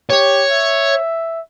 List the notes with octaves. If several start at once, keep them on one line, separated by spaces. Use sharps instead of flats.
G4 C#5
E5